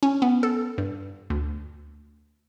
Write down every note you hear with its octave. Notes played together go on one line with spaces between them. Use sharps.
C#4
B3
A4
G2
D2